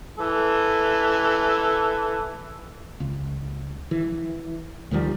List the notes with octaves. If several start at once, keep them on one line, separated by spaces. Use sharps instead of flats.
E3 A4
C#2
E3
D2 D#3 F3 G3